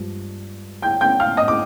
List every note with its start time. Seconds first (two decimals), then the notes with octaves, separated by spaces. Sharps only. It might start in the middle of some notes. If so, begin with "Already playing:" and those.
Already playing: G2 F3 G#3
0.82 G5 G6
1.01 G5 G6
1.20 F5 F6
1.37 D#5 D#6
1.48 D6